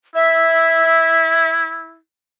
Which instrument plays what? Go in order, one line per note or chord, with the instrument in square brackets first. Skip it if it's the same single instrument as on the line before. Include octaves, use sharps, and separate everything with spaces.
[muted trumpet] E4 [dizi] E5